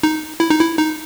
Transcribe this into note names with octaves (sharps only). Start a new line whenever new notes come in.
D#4
E4
D#4
E4
D#4